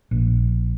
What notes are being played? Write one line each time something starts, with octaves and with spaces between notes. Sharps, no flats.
A#1